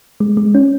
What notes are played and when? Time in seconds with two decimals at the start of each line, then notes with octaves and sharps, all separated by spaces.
0.20 G#3
0.37 G#3
0.54 C#4